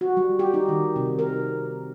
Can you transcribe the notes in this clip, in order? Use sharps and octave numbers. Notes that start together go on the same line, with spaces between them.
F#4
G3
G4
D#4
D#3
C3
A#4